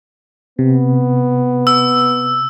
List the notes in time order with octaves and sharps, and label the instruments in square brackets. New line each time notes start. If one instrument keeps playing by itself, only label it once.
[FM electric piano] C3 [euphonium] B3
[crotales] E6